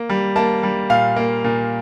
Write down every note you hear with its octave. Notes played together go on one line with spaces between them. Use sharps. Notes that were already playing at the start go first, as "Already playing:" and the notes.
Already playing: A#3
G3
A#3 A5
G3
A#2 F5
A#3
A#2